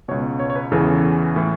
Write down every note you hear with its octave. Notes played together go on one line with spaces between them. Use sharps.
C#2 B2 C#5
C#5
C#5
B4
E2 C#3 E3 A4
A2 E3